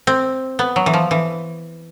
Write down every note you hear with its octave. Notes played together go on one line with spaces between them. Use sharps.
C4
B3
F#3
E3
F3
E3